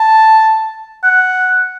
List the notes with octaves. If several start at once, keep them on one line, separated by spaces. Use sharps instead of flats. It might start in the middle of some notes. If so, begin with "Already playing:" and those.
Already playing: A5
F#5